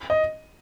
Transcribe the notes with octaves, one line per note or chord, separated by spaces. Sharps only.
D#5